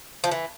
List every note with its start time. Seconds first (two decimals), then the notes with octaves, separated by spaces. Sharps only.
0.24 F3
0.32 E3